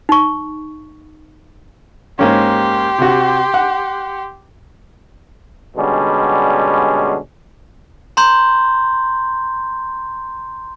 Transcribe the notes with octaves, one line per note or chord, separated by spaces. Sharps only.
D#4 C#6
G#2 A#3 C#4 G4 C6
C3 F#4
F#5
B2 D3 G3 G#3 C#4
A#5 C6 G6